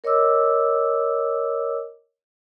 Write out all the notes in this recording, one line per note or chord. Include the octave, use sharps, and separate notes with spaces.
A#4 C#5 D#5 D6 E6